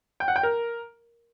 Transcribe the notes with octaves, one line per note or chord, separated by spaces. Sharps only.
G5
F#5
G5
A#4